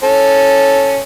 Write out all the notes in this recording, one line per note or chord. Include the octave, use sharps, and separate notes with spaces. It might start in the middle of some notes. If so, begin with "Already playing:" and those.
C#4 A4 C#5